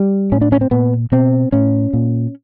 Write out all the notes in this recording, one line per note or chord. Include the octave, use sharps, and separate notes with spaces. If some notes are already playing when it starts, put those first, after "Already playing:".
Already playing: G3
A2 C#4
D4
C#4
C4
A#2 B3
B2 C4
A2 C#4
A#2